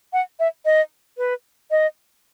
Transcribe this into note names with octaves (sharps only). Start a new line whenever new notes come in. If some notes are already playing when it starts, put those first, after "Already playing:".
F#5
E5
D#5
B4
D#5